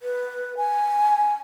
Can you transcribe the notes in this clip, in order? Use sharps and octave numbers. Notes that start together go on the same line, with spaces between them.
B4
G#5